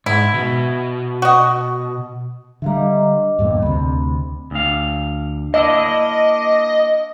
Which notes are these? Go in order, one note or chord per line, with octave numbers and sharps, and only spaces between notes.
G#2 E4
B2
F#4 D#5
D3 G3 E5 F5 A#5
D#5 D6
E2 G2 A#2
D2 C3 B5
D2 F5
A#3 D4 E4 D#5